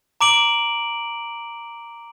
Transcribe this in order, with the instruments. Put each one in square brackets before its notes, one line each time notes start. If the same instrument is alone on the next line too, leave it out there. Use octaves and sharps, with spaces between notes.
[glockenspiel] A#5 D6 D7 F#7